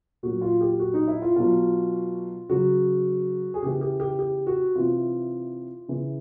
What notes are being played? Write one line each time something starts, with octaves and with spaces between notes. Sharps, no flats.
A#2 F#3 F#4
F4
G4
F#4
D#4
E4
F4
B2 F#3 F4
C#3 F#3 F#4
G#4
C#3 E3 G4
G4
G4
G4
F#4
C3 E3 F4
C#3 E3